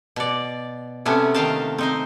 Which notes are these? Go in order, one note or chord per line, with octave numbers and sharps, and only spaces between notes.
B2 D5
C3 A3 B3 C#4
D#3 F5 G5 A5
C4 D#4 C5